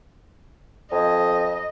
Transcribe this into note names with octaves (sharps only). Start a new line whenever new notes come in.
F2 D#5